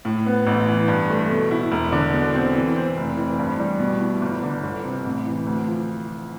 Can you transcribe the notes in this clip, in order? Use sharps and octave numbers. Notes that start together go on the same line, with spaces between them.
A2
B3
A1
E3
G2
A3
B2
E4
E1
D3
B2
C4
E3
C4
F1
E3
G2
G3
B2
E4
G1
D3
G1
C3
A1
E3
D2
F3